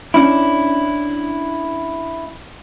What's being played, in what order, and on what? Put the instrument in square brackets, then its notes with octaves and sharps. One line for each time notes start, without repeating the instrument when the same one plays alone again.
[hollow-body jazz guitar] C#4 D4 E4